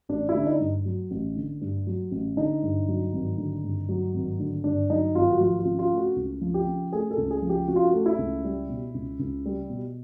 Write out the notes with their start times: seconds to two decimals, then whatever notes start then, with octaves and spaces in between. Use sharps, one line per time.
0.09 A1 D4
0.29 E4
0.35 D3
0.42 D4
0.47 D#4
0.60 G2
0.85 F#3
1.11 A1
1.36 D3
1.61 G2
1.87 F#3
2.11 A1
2.37 D3 D#4
2.62 G2
2.88 F#3
3.13 G#1
3.38 D3
3.64 G2
3.89 F#3
4.14 G#1
4.39 D3
4.64 G2 D4
4.90 F#3 D#4
5.15 G#1 F4
5.30 F#4
5.40 F3 F4
5.59 F4
5.65 C#3
5.79 F4
5.91 A3
5.98 F#4
6.16 C#2
6.41 F3
6.54 G4
6.67 C#3
6.92 A3 G#4
7.11 A4
7.18 C#2
7.30 G#4
7.42 F3
7.49 G4
7.68 C#3 F#4
7.76 F4
7.84 F#4
7.93 A3
8.06 E4
8.18 C#2
8.44 G3
8.69 B2
8.94 C#2
9.19 C#2
9.46 G3
9.70 B2